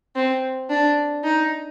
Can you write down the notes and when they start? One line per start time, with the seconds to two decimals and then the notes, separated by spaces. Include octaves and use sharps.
0.16 C4
0.70 D4
1.24 D#4